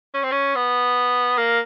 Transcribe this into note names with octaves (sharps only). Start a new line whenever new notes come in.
C#4
C4
C#4
B3
A#3